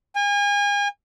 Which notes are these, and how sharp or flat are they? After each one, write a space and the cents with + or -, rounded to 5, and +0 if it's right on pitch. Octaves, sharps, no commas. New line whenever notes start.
G#5 -35